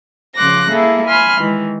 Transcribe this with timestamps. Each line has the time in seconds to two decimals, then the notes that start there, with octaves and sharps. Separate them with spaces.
0.36 C#3 F3 C6 D6 F#6 A#6
0.71 A#3 E4 G#4 A4
1.07 G#5 B5 C6 F6
1.37 D#3 E3 G#3